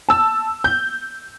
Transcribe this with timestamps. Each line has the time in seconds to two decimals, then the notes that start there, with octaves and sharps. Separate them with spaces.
0.09 A5 E6
0.64 G6